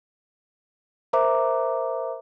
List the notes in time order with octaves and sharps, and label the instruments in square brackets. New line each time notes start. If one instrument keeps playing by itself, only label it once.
[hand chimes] A#4 C5 E5 A#5 D6